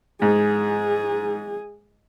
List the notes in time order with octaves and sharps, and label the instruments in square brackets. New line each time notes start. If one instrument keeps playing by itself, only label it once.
[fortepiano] G#2 [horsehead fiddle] G#4